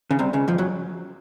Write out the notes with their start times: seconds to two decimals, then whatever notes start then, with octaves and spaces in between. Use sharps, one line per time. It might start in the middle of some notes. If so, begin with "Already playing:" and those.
0.11 C#3
0.19 C2 C3
0.33 C#2 C#3
0.48 F2 F3
0.58 F#2 F#3